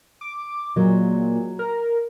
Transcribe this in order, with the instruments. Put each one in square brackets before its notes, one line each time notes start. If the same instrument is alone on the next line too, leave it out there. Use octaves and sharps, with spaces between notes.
[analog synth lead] D6
[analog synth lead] A#2 [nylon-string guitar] F#3 G#3
[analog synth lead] A#4